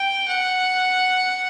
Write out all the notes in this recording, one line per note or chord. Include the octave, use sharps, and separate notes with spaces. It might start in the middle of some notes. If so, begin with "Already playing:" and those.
Already playing: G5
F#5